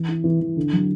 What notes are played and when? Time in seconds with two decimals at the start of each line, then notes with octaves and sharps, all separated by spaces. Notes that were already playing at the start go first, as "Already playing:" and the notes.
Already playing: E3
0.08 E4
0.24 E3
0.40 E3
0.57 D3
0.73 F#3